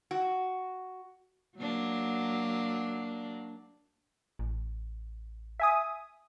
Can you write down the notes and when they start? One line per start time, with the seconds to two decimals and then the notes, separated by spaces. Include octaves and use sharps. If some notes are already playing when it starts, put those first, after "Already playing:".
0.11 F#4
1.58 F#3 A#3 D4
4.39 A1
5.60 E5 G#5 D#6